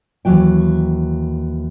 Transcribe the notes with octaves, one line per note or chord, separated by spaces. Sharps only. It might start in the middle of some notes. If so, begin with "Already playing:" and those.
D#2 E3 F#3 G5